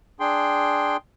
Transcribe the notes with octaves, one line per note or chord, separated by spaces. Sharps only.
D4 G#4 G5 C6